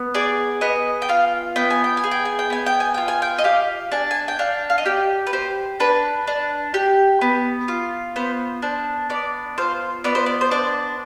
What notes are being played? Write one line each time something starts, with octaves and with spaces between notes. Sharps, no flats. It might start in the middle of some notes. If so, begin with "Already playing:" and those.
Already playing: B3
G#4 D5
B3 D#5
G5
F4 F5
B3 G5
G#5
G5
G#5
G#4
G5
G#5
G5
B3 G#5
G5
G#5
F4 G5
G#5
G5
D#5
G4 F5
D4 G#5
G#5
G5
D4 F5
F5
D#5
G4 D5
B4
G4 C5
D4 B4
D4
G4
B3
F4
B3 C5
D4 C5
B3 D5
F4 C5
B3 D5
C5
D5
C5
D4 D5